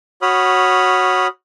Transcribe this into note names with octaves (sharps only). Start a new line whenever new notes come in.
F#4 C#5 B5 D#6 F6